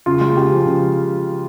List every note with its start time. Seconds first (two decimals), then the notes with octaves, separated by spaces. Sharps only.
0.06 C#3 F4
0.21 G#3
0.36 C#3 G4
0.52 F3
0.66 C#3